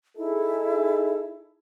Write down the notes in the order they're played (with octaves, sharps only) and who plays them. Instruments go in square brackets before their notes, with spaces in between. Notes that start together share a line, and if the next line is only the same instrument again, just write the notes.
[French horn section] D#4 G#4 A4 [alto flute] E4